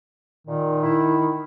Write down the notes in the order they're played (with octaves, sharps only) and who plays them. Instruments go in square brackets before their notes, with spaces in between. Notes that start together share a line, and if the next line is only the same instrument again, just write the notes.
[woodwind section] A#2 [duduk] D#3
[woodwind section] E4